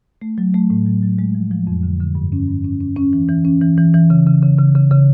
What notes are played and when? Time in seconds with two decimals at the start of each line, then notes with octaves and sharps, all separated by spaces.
0.21 A3
0.38 F#3
0.54 A3
0.70 A2
0.86 F#3
1.03 F#3
1.19 G#3
1.35 F3
1.51 F3
1.67 F2
1.83 D3
2.00 D3
2.15 G2
2.32 C#4
2.48 G2
2.64 C#4
2.81 C#4
2.96 C#4
3.13 E3
3.29 E3
3.45 C#4
3.62 E3
3.78 E3
3.94 E3
4.10 C#3
4.26 C#3
4.42 C#3
4.58 C#3
4.75 C#3
4.91 C#3